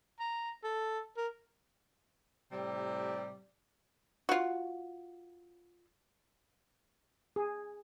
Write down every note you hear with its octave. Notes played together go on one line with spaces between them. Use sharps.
A#5
A4
A#4
A2 C3 G3
F4 F#4
G#4